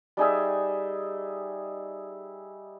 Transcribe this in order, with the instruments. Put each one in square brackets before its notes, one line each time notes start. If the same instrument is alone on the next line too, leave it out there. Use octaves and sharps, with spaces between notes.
[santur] G3 D#4 G#4 E5